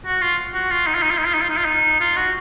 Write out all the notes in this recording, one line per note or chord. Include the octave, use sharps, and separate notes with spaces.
F#4
F4
F#4
F4
D#4
F4
D#4
F4
D#4
F4
D#4
F4
D#4
F4
D#4
F4
F#4